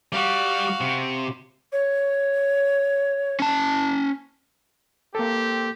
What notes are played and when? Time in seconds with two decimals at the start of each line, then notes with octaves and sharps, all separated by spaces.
0.12 G3 F#4 F5
0.81 C3
1.72 C#5
3.40 C#4 A5
5.15 A#3 C4 G4 A4